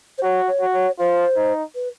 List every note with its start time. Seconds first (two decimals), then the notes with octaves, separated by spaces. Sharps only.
0.18 C5
0.22 F#4 C#5
0.47 C#5
0.61 F#4
0.73 C#5
0.99 F4 C5
1.36 D#4
1.75 B4